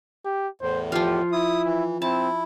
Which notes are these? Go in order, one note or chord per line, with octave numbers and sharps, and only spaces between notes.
G4
E2 A2 C5
F3 F4 G4
E4 D#6
E3
C4 E4 A5